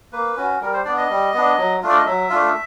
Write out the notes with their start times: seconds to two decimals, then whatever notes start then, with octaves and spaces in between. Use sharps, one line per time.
0.12 A#3 B4
0.37 C#4 F#4
0.61 G3 A#4
0.73 C5
0.85 B3 D4 D5
0.97 D#5
1.10 G3
1.34 B3 D4
1.58 F#3
1.82 A3 D4 F4
1.89 D5
1.97 D#5
2.06 F#3 E5
2.30 A3 D4 F4